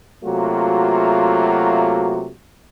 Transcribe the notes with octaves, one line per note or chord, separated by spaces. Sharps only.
C3 F#3 A3 A#3 F4 F#4